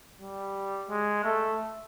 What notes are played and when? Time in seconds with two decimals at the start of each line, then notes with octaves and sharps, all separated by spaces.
0.20 G3
0.89 G#3
1.24 A3